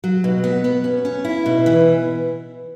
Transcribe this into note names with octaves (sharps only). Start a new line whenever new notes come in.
F#3
B2
B3
B3
C#4
C#4
E4
B2
E3